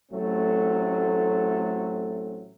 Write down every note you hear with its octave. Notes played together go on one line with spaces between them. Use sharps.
A1 F#3 A3 C4